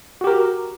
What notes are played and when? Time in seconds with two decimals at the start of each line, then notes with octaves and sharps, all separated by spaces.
0.21 F#4
0.24 G4
0.27 A#4